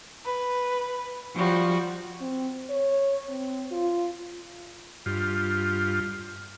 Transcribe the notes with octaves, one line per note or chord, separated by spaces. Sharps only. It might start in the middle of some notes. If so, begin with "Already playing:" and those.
B4
F3 G3 F#4
C4
C#5
C4
F4
G2 F4